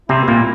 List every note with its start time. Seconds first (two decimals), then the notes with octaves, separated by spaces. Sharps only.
0.09 C3 C4 E4
0.28 A#2 A#3